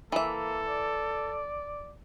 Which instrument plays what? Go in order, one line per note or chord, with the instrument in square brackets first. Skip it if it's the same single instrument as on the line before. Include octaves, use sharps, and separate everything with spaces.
[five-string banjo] E3 E5 [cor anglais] A#3 [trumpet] A4
[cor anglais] D5